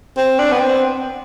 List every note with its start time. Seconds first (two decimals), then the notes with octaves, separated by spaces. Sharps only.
0.17 C4
0.39 D4
0.52 B3
0.60 C4